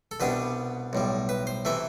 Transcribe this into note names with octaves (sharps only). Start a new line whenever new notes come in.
A4
C2 B2 G3 B3 D4 B4
B1 A2 G3
B4
C5
C3 E3 A3 E5